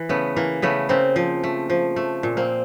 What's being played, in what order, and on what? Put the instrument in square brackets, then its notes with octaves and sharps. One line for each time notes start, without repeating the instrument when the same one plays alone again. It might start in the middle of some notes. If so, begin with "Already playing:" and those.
Already playing: [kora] E3
C#3 A3 B3
E3 A#3
C#3 A3 B3
C#3 A#3 C4
F3
A3
F3
A3
A#2
A#3 C4